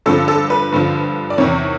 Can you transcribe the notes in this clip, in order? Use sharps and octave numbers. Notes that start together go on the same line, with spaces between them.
G2 D3 F3 A4
A4
B4
G2 D3 F3
D5
E2 C3 D#3 C#5